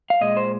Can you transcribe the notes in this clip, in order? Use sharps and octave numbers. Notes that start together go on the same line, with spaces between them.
F5
A#2 G#3 D#5
C5